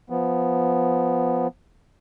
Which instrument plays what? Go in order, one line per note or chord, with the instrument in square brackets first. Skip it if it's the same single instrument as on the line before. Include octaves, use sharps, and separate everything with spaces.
[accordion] F3 B3